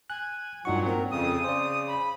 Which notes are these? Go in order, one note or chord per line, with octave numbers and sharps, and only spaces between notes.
G#5 F#6
G2 A#2 F#3 D#4 F#5 C#6
C4 A#4
F2 C#3 D#6
C#3 C5 D5
B5